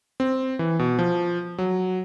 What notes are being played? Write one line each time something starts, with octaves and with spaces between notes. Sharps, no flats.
C4
E3
B2
F3
F#3